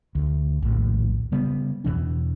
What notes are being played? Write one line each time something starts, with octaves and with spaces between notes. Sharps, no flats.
D2
A#1 D#2 A2 D#3
C#3 G3 B3
E2 B2 E3 D4